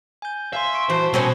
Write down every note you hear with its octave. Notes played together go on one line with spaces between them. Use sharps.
G#5 G6
E5 F5 G#5 C6
C6 C#6 D7
E3 F#4 C5 A5
B2 C4 C#4 C5